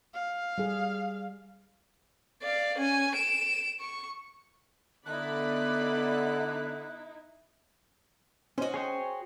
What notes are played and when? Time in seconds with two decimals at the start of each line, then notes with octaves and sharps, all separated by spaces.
0.14 F5
0.58 G3 G#4
2.42 D5 F5
2.78 C#4 G#5
3.16 D7 E7
3.81 C#6
5.06 D3 B3 D#4 E4 D5 B5 F#6
8.58 C#4 F#4 C5 D#5
8.74 G#4 C#5 G5